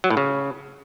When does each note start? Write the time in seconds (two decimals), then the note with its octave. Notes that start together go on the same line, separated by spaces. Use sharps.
0.04 F#3
0.10 A2
0.17 C#3